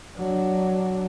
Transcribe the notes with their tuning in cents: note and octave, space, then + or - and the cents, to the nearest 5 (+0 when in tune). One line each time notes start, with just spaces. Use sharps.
F#3 +10 D4 +0